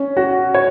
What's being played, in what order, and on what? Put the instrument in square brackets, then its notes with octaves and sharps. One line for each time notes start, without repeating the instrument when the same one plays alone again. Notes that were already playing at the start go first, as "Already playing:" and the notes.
Already playing: [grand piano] C#4
F#4
[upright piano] C#5